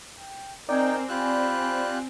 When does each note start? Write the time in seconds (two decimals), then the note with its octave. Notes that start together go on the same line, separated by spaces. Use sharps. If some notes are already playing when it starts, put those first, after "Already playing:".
0.18 G5
0.69 C4 D#4 A#4 D5 G5 G#5
1.09 F4 G4 B5 F#6